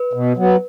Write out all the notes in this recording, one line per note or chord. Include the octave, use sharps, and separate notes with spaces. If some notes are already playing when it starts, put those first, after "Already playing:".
Already playing: B4
B2
F#3 B3